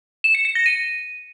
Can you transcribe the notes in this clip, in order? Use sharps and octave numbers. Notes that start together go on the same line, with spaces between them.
E7
C#7
C#7
A#6
D#7